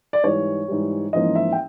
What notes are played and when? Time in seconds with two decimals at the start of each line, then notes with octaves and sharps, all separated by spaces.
0.13 D5
0.24 G#2 E3 G3 C#5
0.68 G#2 E3 G3
1.13 A1 G#2 F3 A#3 C#4 D#5
1.35 E5
1.52 G5